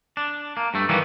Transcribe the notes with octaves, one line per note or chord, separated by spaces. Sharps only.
D4
A#3
G2 A3
D#3 E3 G3 A#3 B3